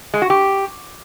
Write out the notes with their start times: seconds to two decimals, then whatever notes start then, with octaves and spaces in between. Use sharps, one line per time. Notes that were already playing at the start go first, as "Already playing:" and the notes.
0.14 G#3
0.22 F#4
0.30 G4